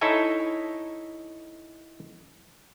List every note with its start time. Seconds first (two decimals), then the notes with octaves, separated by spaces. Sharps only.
0.01 D#4 E4 A4 C#5 E5 G#5